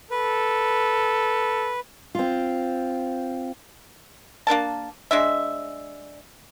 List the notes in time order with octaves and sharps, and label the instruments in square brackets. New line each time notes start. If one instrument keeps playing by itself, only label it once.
[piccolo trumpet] A4 [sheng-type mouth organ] B4
[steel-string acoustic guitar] C4 F4
[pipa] A#3 D4 A#4 A5
G#3 D4 E5